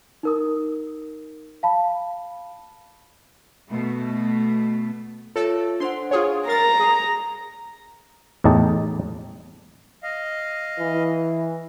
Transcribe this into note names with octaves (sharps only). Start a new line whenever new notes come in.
D#4 A#4 D#6
F5 A5 B5
B2 A3
F4 A4 C#5 E5
D4 C5 F#5 C6
F4 G#4 C#5 G#5
A#4 A#5 A6 C7
G#4
E2 A2 D#4 G4 A5
D#5 F5
E3